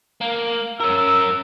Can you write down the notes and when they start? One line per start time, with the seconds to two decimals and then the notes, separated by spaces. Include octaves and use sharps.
0.21 A#3
0.80 C#4 A#4 E6